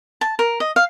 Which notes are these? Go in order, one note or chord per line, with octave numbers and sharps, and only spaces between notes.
A5
A#4
D#5
F5